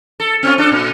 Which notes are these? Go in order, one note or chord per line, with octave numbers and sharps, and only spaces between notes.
A4
C4 C#4 F4
D4 A4
A#2